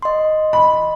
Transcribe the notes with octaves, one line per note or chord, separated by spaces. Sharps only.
D#5 C6
B5